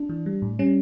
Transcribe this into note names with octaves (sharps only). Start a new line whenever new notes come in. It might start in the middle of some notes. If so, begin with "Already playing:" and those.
Already playing: D4
E3
G3
A2
G3 C#4